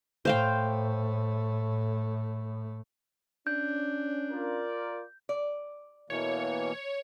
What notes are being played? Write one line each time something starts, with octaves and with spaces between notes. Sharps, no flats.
A2 A3 C5 F5 G5
C#4 D4 G6
F4 A#4 D5
D5
B2 E3 A#3 C#5